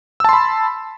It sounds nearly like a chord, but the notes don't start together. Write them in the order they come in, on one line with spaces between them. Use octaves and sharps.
E6 A5 C6 B5